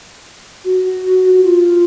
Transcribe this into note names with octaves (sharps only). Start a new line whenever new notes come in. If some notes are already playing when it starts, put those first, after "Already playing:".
F#4
F#4
F4